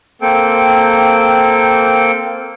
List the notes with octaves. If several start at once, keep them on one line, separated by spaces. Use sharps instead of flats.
A#3 C4 A4 G5